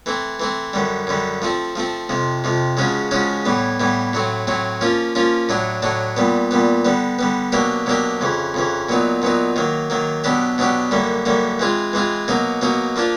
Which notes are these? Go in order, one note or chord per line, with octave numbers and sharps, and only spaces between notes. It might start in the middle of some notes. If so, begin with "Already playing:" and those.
E3 A3 C4
E3 A3 C4
F#2 D3 G3
F#2 D3 G3
F3 A3 C4
F3 A3 C4
F2 C3 F3
F2 C3 F3
C#3 F3 G#3 C#4 F#4
C#3 F3 G#3 C#4 F#4
A2 E3 G3 B3
A2 E3 G3 B3
A2 F#3 A3 C4
A2 F#3 A3 C4
F3 A#3 C#4 F4
F3 A#3 C#4 F4
A2 F#3 A3 D4
A2 F#3 A3 D4
A#2 G3 B3
A#2 G3 B3
D3 G3 B3
D3 G3 B3
B2 F#3 A#3 D4 G4
B2 F#3 A#3 D4 G4
F2 C#3 E3
F2 C#3 E3
A#2 F#3 B3 D#4
A#2 F#3 B3 D#4
D#3 F#3 A#3
D#3 F#3 A#3
B2 F#3 B3 D4 G4
B2 F#3 B3 D4 G4
F#2 D3 G3 A#3
F#2 D3 G3 A#3
E3 G#3 C4 F4
E3 G#3 C4 F4
B2 F#3 A#3 D#4 F#4
B2 F#3 A#3 D#4 F#4
F3 A#3 D4 F4